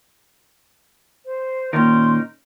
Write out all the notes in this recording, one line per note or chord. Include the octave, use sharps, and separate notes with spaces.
C5
A#2 D#3 C#4 D#4 A#4 C6